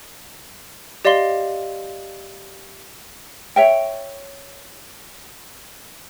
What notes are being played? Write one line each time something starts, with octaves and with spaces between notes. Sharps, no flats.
G4 D5 D#5 F5 C6 G7
C#5 E5 G5